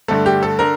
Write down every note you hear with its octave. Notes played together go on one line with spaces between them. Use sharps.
G2 D3 A3 A4
G4
A4
D3 A#4